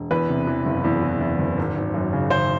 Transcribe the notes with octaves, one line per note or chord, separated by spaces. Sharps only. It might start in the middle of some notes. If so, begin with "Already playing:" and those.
Already playing: E1
E2 B4
C3
E3
F#1
E2
E3
E2
F#1
G#1
G#1
F#2
C#3
C#3 C5